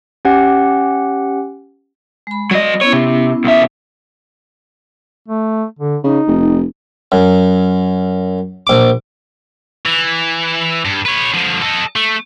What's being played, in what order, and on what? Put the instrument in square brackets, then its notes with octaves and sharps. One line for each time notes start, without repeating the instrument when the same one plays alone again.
[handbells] C#4 G4 F#5
[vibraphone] G#3 B5
[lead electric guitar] F#3 D#5 [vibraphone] D5
[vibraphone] B3 C#4 E4 [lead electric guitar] C#5
[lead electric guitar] C3
B1 E5
[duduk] A3
D3
[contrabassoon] C#3 [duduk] D#4
[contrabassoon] F1
[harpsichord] F#2
A#1 D6
[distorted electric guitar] E3
G2
B4 C#5
D3 F3
A4 D#5
A3